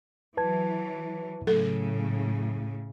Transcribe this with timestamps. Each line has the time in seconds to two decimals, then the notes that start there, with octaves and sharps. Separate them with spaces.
0.37 E3 F#3 B4 A5 G#6
1.47 A2 C#3 F#3 A4